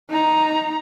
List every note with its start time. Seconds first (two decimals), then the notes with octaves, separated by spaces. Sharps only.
0.10 D#4 A#5